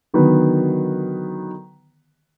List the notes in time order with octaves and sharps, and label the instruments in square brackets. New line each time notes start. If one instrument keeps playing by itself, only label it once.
[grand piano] D3 D#3 F#3 B3 B4